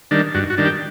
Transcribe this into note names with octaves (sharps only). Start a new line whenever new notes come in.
D#3 G3 D4
G2 F#4
F#4
D#3 G3 D4
G4